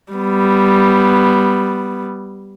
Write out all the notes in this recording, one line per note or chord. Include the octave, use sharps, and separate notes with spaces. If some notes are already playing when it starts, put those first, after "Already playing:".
G3 B3